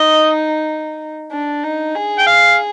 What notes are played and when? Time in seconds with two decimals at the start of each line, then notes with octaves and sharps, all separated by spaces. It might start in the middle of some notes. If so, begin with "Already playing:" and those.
Already playing: D#4 D#5
1.32 D4
1.63 D#4
1.95 G#4
2.19 G5
2.27 F5